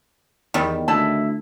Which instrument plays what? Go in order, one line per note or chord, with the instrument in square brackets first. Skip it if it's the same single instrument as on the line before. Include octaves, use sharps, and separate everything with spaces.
[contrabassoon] E2 [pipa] D#3 G3
[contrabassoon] D2 [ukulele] E4 [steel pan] A5